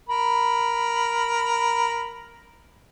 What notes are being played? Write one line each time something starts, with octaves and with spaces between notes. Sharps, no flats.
A#4 B5